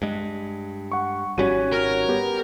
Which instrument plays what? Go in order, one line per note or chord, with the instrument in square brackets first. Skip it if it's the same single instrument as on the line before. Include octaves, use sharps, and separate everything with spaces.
[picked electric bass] G2 G#3
[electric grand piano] F#5 C#6
[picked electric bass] G#1 G3 C#4 [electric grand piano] F#4 D#7 [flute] C#5
[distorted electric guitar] A#4
[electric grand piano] B3 G4